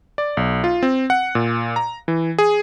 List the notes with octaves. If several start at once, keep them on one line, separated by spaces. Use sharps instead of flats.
D5
B1
F4
C4
F#5
A#2
A#5
E3
G#4